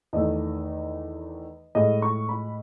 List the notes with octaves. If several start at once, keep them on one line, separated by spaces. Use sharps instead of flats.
E2 D#3 A3 D#5
A2 G#3 D#5
C#6
B5